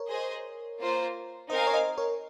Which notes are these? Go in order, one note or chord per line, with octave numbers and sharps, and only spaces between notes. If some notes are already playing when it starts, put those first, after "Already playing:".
Already playing: A#4 C#5
G#4 C5 D#5
A#3 F4 C5
C4 D#4 A#4 C5 D#5 F5 G#5
C#5
C5 D#5
A#4 C#5